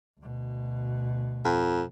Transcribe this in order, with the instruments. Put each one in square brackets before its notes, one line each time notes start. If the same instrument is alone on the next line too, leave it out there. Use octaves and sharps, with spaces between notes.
[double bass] D2 B2
[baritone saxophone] F2